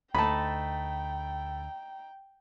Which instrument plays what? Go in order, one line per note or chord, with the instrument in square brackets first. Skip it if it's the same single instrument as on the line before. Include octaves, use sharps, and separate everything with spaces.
[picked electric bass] D2 [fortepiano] A3 B5 [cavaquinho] D#4 A5 [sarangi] G5